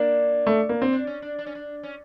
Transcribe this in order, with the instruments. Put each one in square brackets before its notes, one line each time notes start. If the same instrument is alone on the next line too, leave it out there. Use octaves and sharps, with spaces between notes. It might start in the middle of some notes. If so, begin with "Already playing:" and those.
Already playing: [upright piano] A#3 [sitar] D4
[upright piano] A3
A#3
C4
[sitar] D4
C#4
D4
D4
C#4
D4
C#4